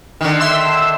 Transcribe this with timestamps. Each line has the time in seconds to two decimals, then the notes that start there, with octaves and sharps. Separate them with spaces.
0.21 D3 D#3
0.39 E5 C6 E6